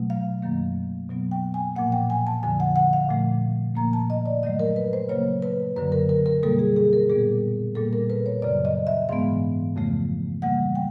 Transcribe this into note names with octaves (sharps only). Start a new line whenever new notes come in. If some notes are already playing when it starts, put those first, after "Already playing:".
Already playing: B2 F#3 A3
F5
F#2 D#3 F#3 A#3
B2 F#3 B3
G5
G#5
A#2 F3 A#3 F#5
G5
G#5
A5
F2 D3 F3 G#5
F#5
F#5
F5
A#2 F3 A3
A#2 F3 A#3 A#5
A5
D#5
D5
G2 D#3 F#3 A3 D#5
A#4
B4
C5
C#3 F#3 A#3 C#5
B4
F#2 D3 F#3 B4
A#4
A#4
A#4
B2 G3 A#3 A4
G#4
G#4
A#4
A#2 G3 B3 G#4
A#2 G3 A#3 A4
A#4
B4
C#5
F#2 C#3 F#3 D5
D#5
E5
G#2 E3 G#3 B3 F5
F2 C#3 F3 A3
C#3 E3 G3 A#3 F#5
G5